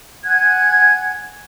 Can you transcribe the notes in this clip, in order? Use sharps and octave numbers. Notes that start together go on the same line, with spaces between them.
F#5 G#5 F#6 G#6